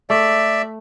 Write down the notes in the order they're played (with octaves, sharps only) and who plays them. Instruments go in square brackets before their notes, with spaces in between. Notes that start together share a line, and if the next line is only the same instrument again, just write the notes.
[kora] A3 [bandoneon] D5 E5